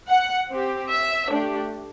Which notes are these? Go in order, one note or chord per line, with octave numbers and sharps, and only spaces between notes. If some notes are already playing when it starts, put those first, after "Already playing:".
F#5
C4 G4
E5
A3 D4 G4